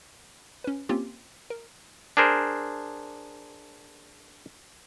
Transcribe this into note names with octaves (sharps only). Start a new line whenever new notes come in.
C#4 B4
A#3 C4 C#4 F4 G4
A#4
D4 G#4 A#4 C5